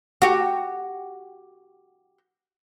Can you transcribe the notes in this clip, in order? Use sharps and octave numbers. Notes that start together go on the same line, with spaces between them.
F#4 G4